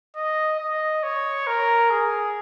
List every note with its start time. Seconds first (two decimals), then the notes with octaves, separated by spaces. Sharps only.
0.16 D#5
0.59 D#5
1.03 C#5
1.47 A#4
1.90 G#4